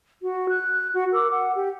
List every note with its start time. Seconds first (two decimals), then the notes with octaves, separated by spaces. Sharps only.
0.20 F#4
0.49 F#6
0.94 F#4
1.13 A#4 D6 E6
1.32 F#5
1.55 G4